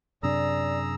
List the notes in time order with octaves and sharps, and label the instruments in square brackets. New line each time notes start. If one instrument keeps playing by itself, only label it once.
[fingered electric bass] F#2 C3 D4 [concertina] G#4 A#5 E6 [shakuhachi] D5